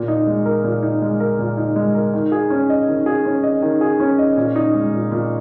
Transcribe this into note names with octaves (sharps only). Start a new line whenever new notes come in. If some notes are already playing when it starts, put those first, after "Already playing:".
Already playing: A#2
D#4
G#3
A#4
A#2
D#4
G#3
A#4
A#2
D#4
G#3
A#4
D#3
G#4
C#4
D#5
D#3
G#4
C#4
D#5
D#3
G#4
C#4
D#5
A#2
D#4
G#3
A#2
A#2